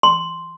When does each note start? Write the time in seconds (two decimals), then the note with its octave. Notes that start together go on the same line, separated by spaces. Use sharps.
0.03 C6